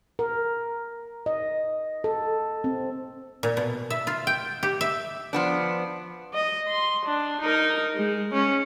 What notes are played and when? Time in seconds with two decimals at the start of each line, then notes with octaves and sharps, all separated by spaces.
0.19 A#4
1.26 D#5
2.04 A4
2.64 C4
3.43 A#2
3.57 B2
3.90 E5
4.07 F4
4.27 G5
4.63 G4
4.81 E5
5.33 F3 B3 D4
6.33 D#5
6.68 C6
7.05 D4
7.41 D#4 A#4
7.96 G#3
8.34 C#4